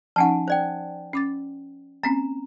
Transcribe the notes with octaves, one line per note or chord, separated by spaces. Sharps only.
F3 C#4 D#4 F#5 G#5 A5
C5 D5 G5
C#4 D6 A6
A#3 C4 C#4 A#5